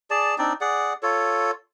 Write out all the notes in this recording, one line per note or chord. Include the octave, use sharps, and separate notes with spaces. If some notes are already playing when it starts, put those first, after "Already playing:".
G#4 D5 A5
C4 D4 D#4 D5
G#4 D5 F#5
F4 A4 C#5